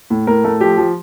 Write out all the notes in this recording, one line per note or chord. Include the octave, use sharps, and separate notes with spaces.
A2
A2 A#4
A3
F3 G4
F3